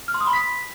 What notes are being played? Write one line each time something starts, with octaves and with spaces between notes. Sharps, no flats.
F6
C6
D#6
B5
B6